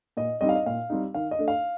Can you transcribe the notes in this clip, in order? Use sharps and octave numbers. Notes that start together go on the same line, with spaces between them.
A#2 D#5
G3 C4 D#4 D#5
F5
D#5
A#2 F5
G3 C4 D#4
D#3 F5
D#5
A3 D4
F5